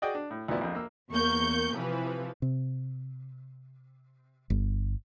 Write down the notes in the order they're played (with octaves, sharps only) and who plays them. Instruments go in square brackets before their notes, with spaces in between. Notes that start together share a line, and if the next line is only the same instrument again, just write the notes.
[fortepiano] F#4 G#4 D5 D#5 G5
D4
A2
D2 A#2 F3 B3 E4 D5
A#1 F2
A#3 E6
[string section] E2 A#3 C#6 G6
C3 E3 F3 B4
[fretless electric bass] C3
G1